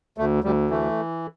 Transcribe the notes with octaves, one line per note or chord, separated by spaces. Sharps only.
D2 A3
D2 G3
E3 A3